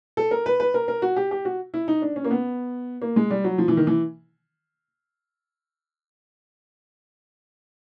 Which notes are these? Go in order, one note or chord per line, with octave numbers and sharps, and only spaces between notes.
A4
A#4
B4
B4
A#4
A#4
F#4
G4
G4
F#4
E4
D#4
D4
C#4
A#3
B3
A#3
G#3
G3
F#3
F3
E3
D#3
E3